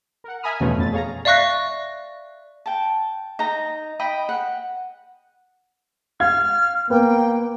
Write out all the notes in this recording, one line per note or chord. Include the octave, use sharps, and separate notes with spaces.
A#4 F#5
E5 G#5 A#5 B5 D#6 F6
E2 B2 E3 F3 A3 C#4
F2 B2 A3 C4 A6
G#4 C#5 F5 A#5
D5 E5 F5 C#6 F#6 A#6
G5 A5
D#4 A#5
D#5 G5 B5
F#5
F5 F6 G#6
A#3 B3 G5